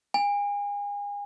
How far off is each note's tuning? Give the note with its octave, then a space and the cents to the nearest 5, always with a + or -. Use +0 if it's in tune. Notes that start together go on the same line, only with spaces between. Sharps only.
G#5 -35